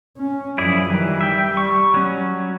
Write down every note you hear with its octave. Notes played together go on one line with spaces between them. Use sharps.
C#4
F#2 F3 E4 G#4 D5
D#3 E3 G3
E5 G5
C#6
F#3 C#4